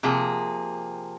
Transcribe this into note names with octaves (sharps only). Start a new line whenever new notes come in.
C3 F3 A#3 G#4